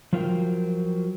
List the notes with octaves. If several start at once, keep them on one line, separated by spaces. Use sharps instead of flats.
F3 F#3 F4 A#4 E5 G5